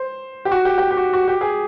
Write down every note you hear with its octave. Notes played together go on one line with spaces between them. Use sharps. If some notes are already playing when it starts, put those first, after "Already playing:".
Already playing: C5
G4
F#4
G4
G4
G4
F#4
F#4
G4
G#4